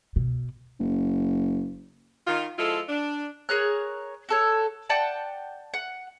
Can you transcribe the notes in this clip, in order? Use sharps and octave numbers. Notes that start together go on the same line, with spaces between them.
B2
F#1
D#3 F4
F3 G#3 E4 F4 A4
D4
G#4 A#4 C#5 F#6
F#4 A4 C#5
D5 F#5 G5 A5
F#5